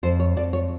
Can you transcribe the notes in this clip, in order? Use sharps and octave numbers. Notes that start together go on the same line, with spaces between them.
F2 C5
C#5
F2 D5
C#5